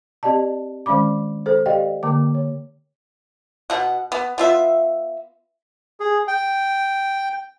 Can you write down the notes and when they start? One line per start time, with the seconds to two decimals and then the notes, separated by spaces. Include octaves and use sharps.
0.23 C4 G4 D5 D#5 A5
0.86 D#3 G#3 C#4 D5 B5 D6
1.46 A4 C5
1.66 G4 D5 D#5 F5 G5
2.03 D3 A#3 G5 D6
2.35 C#5
3.70 B2 F#5
4.12 B3
4.38 B3 F4 E5
6.00 G#4
6.27 G5